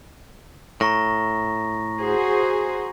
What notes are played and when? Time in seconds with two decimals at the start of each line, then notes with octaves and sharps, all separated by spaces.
0.81 A2 A#5 C#6 A#6
1.99 F#4 G#4 C5